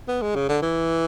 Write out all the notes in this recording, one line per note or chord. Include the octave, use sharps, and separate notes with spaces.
B3
G#3
C#3
D3
E3